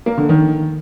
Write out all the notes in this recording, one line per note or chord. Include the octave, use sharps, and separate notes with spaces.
A#3
D3
D#3